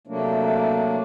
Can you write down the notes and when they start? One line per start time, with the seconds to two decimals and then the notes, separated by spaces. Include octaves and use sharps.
0.07 C3 F#3 A3 A#3 D4